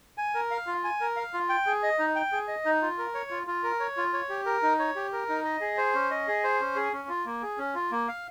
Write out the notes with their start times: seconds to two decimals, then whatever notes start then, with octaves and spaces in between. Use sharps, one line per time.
0.18 G#5
0.34 A#4
0.51 F5
0.67 F4
0.84 G#5
1.00 A#4
1.16 F5
1.34 F4
1.49 G5
1.66 G#4
1.83 D#5
1.99 D#4
2.16 G5
2.32 G#4
2.48 D#5
2.65 D#4
2.82 F4
2.98 A#4
3.15 C#5
3.31 F4
3.47 F4
3.63 A#4
3.80 C#5
3.97 F4
4.13 C#5
4.29 G4
4.46 A#4
4.63 D#4
4.79 C#5
4.96 G4
5.12 A#4
5.29 D#4
5.44 D#5
5.61 G#4
5.77 C5
5.94 C#4
6.11 D#5
6.27 G#4
6.44 C5
6.60 C#4
6.76 G#4
6.93 C#4
7.09 F4
7.26 A#3
7.43 G#4
7.58 C#4
7.75 F4
7.92 A#3
8.08 F5